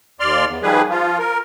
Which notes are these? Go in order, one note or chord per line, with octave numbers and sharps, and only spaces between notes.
D#2 D5 C6 F6
E2
D#3 F3 G3 G#4 B4
F3 F4
A#4